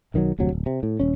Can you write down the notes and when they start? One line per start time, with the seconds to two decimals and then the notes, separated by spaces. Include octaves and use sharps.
0.14 B1 D#3 E3 F#3
0.39 F1 D2 C3 F#3
0.52 D1
0.66 C3
0.83 A2
1.00 D#1 C#4